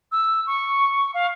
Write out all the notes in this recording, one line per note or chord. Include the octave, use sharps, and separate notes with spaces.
E6
C#6
F5